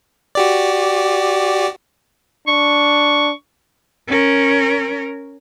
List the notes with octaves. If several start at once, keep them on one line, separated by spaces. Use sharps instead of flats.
F#4 G4 D5
D4 C#6
C#4 A#4